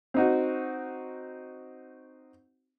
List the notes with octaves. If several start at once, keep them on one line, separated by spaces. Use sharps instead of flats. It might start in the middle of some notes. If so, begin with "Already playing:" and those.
C4 D#4 F#4